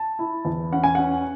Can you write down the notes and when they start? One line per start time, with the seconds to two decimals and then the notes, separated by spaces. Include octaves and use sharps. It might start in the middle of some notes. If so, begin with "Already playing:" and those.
Already playing: A5
0.19 E4
0.45 E2
0.72 C#4 F#5
0.84 G#5
0.95 C#4 F#5